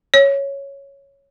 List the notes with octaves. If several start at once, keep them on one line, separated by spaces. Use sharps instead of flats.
C#5